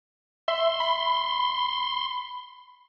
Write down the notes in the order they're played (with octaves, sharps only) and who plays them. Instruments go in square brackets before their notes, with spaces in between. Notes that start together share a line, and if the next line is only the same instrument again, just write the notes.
[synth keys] E5 [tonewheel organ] C6
[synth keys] B5